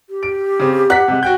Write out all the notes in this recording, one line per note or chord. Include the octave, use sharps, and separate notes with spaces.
G4
D7
C#3 C4
F#5 A#5 B6
C3 G#3
F#4 G5 G6